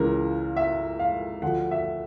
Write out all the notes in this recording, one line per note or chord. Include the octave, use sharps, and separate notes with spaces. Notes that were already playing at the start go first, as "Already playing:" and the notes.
Already playing: C#2 C#3 E3 A#4
E5
F5
D2 D3 F3 F#5
E5